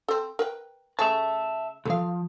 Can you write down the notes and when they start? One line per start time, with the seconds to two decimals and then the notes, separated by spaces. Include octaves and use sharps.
0.08 C4 A4
0.39 A#4 B4 G5
0.99 C#3 A3 C#4 E5 A5
1.85 C#2 F3 A4 F5